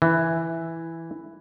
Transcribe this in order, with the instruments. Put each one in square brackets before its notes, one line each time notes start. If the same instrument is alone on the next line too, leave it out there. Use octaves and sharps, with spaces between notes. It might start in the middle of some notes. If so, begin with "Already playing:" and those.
[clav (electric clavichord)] E3